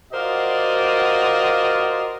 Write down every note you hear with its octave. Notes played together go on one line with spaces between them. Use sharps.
F4 F#4 A#4 C5 D5 D#5